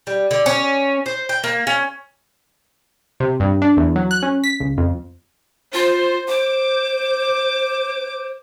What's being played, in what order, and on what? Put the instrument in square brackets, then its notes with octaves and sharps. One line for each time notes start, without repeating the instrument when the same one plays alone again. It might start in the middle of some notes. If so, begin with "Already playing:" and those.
[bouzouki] G3
D3
C#4
C5
G5
A#3
C#4
[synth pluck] C3
G2
D4
E2
F#3
F#6
C#4
B6
C#2
F2
[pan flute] F4 [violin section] C5
[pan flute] C5 [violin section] D6